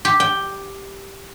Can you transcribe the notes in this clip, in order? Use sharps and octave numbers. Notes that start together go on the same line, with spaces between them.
G4
G5